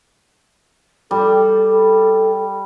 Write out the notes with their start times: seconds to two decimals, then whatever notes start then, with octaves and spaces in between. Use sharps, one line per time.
1.11 G3 A4